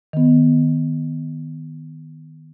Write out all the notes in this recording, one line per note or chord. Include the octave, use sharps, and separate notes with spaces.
D#3 B3